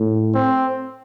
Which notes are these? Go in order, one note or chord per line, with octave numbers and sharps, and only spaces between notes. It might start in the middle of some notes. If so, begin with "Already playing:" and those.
Already playing: A2
C4